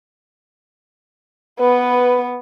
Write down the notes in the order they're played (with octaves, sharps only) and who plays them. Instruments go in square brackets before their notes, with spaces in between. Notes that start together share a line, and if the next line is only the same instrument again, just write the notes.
[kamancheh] B3 [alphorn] B4